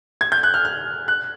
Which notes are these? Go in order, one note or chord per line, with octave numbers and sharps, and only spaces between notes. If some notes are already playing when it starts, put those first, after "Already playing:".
G#6
G6
F#6
F6
F6
F#6